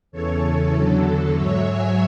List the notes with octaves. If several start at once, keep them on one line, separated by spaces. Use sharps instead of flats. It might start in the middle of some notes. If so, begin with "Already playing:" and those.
E2 C#3 E3 A4 C#5
A4 C#5
E2 D3 F#3 A4
A4
G#2 F#3 C#5 E5
E5 G#5